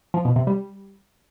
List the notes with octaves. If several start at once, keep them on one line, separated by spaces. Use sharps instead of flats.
F3
B2
C3
G3